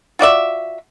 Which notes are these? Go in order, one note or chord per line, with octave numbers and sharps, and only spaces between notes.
F4 F#4 D5 E5